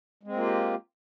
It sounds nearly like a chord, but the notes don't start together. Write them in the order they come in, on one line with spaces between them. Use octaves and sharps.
G#3 C4 A#3 F4 G4